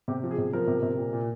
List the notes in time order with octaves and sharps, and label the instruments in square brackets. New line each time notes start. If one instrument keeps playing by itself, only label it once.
[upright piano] C3 G4
F3
G#4
C3
F3 A#4
C3
C3
A#2
A#2